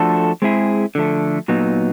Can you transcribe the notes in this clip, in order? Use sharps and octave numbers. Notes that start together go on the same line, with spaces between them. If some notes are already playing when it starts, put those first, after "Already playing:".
Already playing: F3 A3 D4 F#4 A4
G#3 C4 E4 G#4
D3 F3 A3
A#2 F#3 B3 D#4